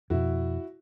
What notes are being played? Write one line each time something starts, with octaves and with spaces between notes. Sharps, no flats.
F2 B2 E4 F#4